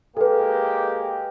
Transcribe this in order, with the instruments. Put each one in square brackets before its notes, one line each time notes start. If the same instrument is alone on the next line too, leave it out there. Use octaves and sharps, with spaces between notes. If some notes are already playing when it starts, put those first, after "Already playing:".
[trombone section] G#3 A#3 G4 [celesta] A4 B4